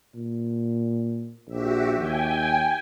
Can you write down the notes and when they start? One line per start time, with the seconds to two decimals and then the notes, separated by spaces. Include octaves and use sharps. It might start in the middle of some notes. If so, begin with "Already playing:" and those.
0.15 A#2
1.48 A#1 F#4 G4 E5
2.00 D#2 G5 G#5